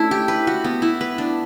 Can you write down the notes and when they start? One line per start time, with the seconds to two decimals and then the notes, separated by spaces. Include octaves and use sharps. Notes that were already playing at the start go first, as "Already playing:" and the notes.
Already playing: A3 C#4 D4 E4
0.11 G4
0.28 B4
0.47 F#4
0.64 B3
0.82 E4
1.01 B4
1.18 D4